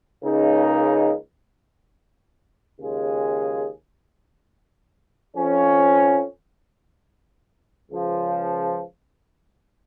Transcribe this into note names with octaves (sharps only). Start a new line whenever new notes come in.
C#2 C#3 A#3 D#4
D#2 C#3 G#3 F4 G#4
F2 F3 C#4
C#2 C#3 F3